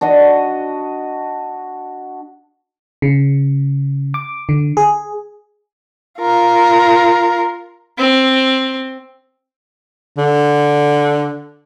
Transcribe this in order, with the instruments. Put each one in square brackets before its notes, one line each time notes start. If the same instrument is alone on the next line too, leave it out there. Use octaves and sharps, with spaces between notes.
[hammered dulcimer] D4 F#4 D#5
[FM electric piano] C#3
D6
D3
G#4
[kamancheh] F4 A#4
[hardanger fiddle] C4
[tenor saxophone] D3